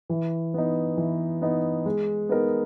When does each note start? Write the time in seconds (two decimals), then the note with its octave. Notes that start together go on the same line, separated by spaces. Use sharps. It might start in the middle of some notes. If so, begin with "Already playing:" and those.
0.10 E3
0.54 B3 D#4
0.97 E3
1.42 B3 D#4
1.86 G#3
2.29 B3 D#4 A#4